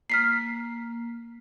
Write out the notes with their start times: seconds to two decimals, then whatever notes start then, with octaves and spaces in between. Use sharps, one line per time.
0.10 A#3 F6 B6 C7